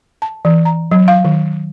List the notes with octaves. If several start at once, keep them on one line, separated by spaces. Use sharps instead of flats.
A5
E3
A#5
F#3
F5
D#3